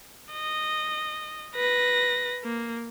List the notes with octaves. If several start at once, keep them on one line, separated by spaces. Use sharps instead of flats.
D#5
B4 A#6
A#3